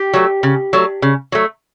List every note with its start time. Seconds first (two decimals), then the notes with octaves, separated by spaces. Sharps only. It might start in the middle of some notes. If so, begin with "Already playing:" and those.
Already playing: G4
0.14 F#3 A3
0.43 C#3
0.73 F#3 A3
1.02 C#3
1.32 F#3 A3